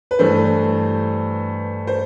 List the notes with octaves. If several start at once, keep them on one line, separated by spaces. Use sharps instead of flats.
B4
G2 E3 A3 C5
C5